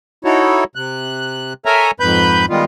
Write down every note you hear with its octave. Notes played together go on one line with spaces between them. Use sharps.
D#4 E4 F#4 A4 C#5
C3 F#6
A4 A#4 C#5 E5 G#5 A#5
F2 G#2 B4 B5 G6
D#3 G3 G#3 B3 F4